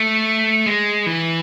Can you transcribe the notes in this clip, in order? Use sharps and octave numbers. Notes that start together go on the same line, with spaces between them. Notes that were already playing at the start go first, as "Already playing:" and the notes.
Already playing: A3
G#3
E3